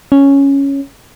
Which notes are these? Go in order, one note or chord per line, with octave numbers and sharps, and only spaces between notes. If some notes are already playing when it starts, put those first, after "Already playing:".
C#4